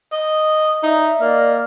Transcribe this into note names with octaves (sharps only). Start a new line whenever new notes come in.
D#5
D#4 D5 E5
E5
A#3 D5 D#5 F6